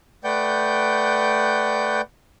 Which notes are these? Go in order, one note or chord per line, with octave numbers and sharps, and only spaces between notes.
A3 B4 D5 F#5 G5 G6